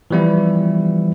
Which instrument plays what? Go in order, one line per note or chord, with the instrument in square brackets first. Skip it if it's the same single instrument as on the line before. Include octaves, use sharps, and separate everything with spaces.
[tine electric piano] E3 F3 G3 B3 E4